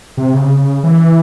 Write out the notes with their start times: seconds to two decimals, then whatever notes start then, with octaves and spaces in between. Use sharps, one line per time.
0.17 C3
0.34 C#3
0.84 E3